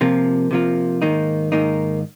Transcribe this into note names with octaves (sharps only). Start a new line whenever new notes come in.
C3 F3 A#3 F4
C3 F3 A#3 F4
G#2 D#3 A#3 D#4
G#2 D#3 A#3 D#4